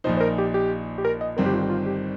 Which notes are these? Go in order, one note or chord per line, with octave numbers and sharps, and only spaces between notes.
A#1 A#2 F3 D#4 C5
C5
A#4
G4
G4
G4
A#4
D#5
G1 G2 D#3 C4 A#4
G4
F4
G4
F4
G4